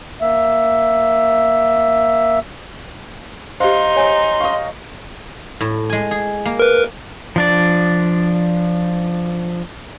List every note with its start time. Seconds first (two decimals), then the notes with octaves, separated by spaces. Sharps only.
0.21 A#3 E5
3.60 D#4 G4 C5 F5 C6
3.96 C#5 G#5
4.40 D#5 F5 C#6
5.61 A2
5.90 G#3 G#5
6.11 G#4
6.45 A#3
6.60 A#4 B4
7.36 F3 D4 D5